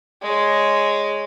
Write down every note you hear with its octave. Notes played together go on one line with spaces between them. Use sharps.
G#3 C#5